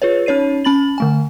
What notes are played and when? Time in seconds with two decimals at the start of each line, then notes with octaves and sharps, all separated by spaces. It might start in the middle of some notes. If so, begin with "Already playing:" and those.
0.02 F4 G#4 B4 C#5
0.26 C#4 D#4 C#5 C7 D#7
0.64 C#4 B5 A6 F#7
0.98 D3 A3 G#5